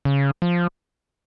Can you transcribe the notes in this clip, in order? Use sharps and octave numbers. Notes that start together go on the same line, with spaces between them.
C#3
F3